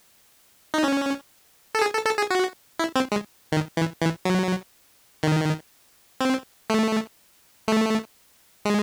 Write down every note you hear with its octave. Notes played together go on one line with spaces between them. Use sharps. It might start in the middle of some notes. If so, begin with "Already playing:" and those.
D#4
C#4
A4
G#4
A4
A4
G#4
F#4
E4
C4
G#3
D#3
E3
E3
F#3
D#3
C4
A3
A3
G#3